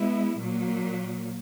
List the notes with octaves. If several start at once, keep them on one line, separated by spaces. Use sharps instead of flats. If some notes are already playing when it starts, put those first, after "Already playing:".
Already playing: G#3 B3 E4
A#2 F#3 A#3